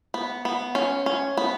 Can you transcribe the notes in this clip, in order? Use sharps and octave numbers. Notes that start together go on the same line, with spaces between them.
B3
B3
C#4
C#4
B3